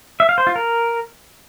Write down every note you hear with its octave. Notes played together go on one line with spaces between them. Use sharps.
E5
F5
C5
F4
A#4